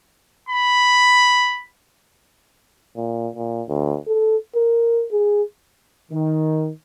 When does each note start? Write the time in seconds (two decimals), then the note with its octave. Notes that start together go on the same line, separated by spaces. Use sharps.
0.49 B5
2.96 A#2
3.36 A#2
3.68 D2
4.07 A4
4.55 A#4
5.12 G#4
6.11 D#3